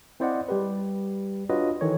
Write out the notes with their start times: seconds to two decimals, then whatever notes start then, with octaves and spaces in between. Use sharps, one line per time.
0.20 C4 E4 C5 D5 D#5 F#5
0.48 G3 G4 B4
1.50 D4 F4 F#4 B4 C#5 D#5
1.81 D#3 E3 A4 C#5